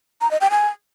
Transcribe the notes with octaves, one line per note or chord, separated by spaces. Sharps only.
A#5
D#5
G5
G#5